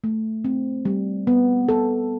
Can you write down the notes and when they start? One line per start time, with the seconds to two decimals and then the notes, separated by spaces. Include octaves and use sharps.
0.04 A3
0.45 C4
0.85 G3
1.27 B3
1.69 A4